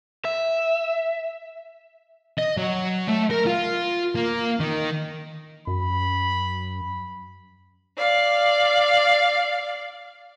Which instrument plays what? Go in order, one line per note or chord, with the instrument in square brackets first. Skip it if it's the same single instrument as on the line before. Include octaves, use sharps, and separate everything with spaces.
[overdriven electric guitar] E5
[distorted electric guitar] D#5
F#3
A3
A#4
F4
A#3
D#3
[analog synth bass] F#2 [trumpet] B5
[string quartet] D5 F5